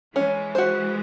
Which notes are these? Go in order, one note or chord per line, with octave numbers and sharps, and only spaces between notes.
E3 G#3 C#4
F#4 C5